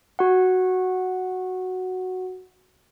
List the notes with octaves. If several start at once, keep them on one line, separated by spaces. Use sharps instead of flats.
F#4 F#5